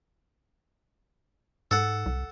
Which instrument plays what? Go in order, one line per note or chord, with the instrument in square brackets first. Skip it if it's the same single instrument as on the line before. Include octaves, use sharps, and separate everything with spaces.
[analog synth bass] G#2 [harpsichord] A4 F#5
[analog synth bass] C2